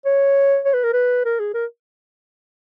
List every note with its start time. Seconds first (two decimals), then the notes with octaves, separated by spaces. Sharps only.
0.06 C#5
0.65 C#5
0.74 B4
0.84 A#4
0.93 B4
1.25 A#4
1.39 G#4
1.54 A#4